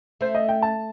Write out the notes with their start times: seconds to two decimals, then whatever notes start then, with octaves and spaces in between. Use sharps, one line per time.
0.21 A3 C5
0.35 D#5
0.49 G5
0.62 A5